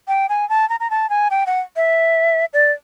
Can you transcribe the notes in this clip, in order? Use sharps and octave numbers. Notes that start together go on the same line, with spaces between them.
G5
G#5
A5
A#5
A#5
A5
G#5
G5
F#5
E5
D5